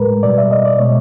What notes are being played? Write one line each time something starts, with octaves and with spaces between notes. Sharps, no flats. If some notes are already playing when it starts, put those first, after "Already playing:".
Already playing: A2 G#3 A#4 B4
B2 G3 D5
E5
D#5
D5
B2 G#3 C#5